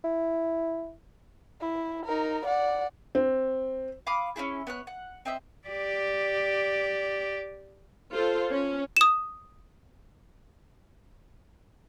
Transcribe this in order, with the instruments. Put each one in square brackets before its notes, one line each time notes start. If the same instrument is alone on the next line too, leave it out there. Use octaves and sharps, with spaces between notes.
[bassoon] E4
[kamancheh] E4
D#4 A#4
D5 F#5
[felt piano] C4
[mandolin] F5 B5 D6 D#6
C#4 D4 E4 G#4
B3 C#5 F#6
F#5
C4 D#5 E5
[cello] G4 D5
[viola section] F4 A4 C5
C#4
[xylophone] D#6 E7